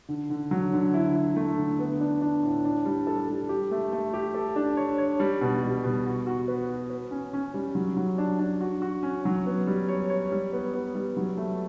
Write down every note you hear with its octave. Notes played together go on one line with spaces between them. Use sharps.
D3
D3
F#3
D3
E4
E4
A3
D3
B3
D4
D4
A2
D4
G3
A4
G3
G4
A3
A3
G4
A4
D4
C#5
C#5
G3
B2
G3
B2
F#4
F#4
B4
F#4
B4
C#4
C#4
G3
F#3
F#3
D4
D4
F#4
F#4
C#4
F#3
B3
G3
C#5
C#5
G3
B3
B3
G3
F#3
A3